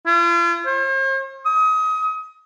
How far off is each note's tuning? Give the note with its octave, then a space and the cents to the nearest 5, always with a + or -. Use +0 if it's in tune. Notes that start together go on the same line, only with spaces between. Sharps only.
F4 -40
C5 +45
D#6 +30